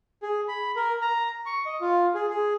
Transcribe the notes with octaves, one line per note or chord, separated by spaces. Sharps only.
G#4
B5
A#4
A#5
C#6
D#5
F4
G#4
G#4